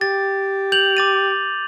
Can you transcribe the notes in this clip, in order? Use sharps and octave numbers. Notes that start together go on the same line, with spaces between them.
G4 A6
G6 F7 F#7
D6 A6 D#7